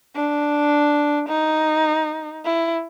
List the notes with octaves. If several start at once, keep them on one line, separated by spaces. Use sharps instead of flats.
D4
D#4
E4